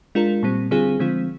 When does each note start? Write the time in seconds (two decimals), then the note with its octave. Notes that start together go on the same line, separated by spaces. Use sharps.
0.15 G#3 D4 F4 A#4
0.43 A#2 G3 C4
0.71 D3 G3 C4 F4 G#4
0.99 D3 F3 G#3 C4 F4